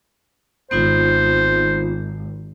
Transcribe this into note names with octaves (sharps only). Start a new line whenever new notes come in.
G#1 B3 D#4 F4 C5